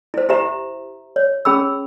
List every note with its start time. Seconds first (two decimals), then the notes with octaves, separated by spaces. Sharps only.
0.14 E4 C5
0.29 E4 G4 C5 E5 A#5
1.16 C#5
1.45 C#4 G#4 B5 E6